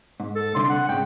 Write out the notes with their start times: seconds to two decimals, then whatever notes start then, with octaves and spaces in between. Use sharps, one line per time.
0.20 G#2
0.35 A4
0.55 C2 D3 C6
0.70 F#5
0.89 G#2 C#3 G5